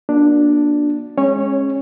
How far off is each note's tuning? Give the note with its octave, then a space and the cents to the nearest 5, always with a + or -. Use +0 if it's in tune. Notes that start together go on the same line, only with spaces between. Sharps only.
A#3 +35 D4 +0 F#4 -40
G#3 +0 C#4 -25 C#5 +0